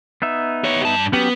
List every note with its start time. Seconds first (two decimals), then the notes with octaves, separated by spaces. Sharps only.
0.22 B3 D#4 E5
0.64 G4 C#5
0.85 G2 A5
1.13 F#3 B3 C#4 G4